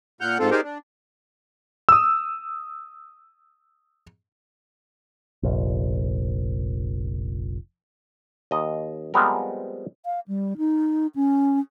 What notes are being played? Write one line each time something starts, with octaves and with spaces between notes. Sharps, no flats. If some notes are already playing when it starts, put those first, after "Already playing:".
A#2 F#5 F6 G6
G#2 C4 F4 A4
D#4 G4 G#4 A#4 C5 D5
D4
D#6 E6
F1 A#1
D#2 D#5
F3 G3 G#3 B3 C4 A#4
F5
G3
D#4
C#4